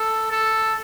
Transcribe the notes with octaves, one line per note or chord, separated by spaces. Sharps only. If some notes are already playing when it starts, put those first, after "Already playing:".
Already playing: A4
A4